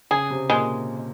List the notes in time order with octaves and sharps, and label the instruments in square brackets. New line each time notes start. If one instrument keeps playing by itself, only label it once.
[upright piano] C#3 [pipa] G#4
[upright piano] C3
[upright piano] A#2 [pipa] G#3